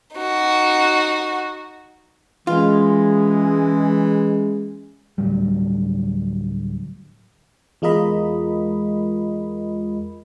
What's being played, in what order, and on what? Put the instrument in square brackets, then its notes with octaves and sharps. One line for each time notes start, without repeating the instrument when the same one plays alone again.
[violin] D#4 F#4
[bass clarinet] E3 [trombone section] G#3 [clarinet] C#4 [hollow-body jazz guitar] F4
[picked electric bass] D2 A2 F#3 G3
[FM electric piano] E2 G#3 F4 A#4 D#5 B5